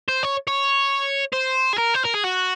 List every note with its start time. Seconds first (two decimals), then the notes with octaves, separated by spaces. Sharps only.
0.09 C5
0.23 C#5
0.48 C#5
1.33 C5
1.73 G#4
1.78 A#4
1.95 C5
2.05 A#4
2.15 G#4
2.24 F#4